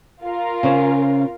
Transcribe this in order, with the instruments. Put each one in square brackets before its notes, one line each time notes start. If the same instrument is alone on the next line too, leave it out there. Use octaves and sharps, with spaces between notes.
[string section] F4 A#4
[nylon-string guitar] C#3 C#4 C5